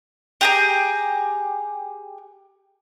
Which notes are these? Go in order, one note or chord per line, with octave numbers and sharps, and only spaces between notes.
G4 G#4 A#5